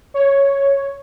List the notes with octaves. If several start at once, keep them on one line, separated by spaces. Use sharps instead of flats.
C#5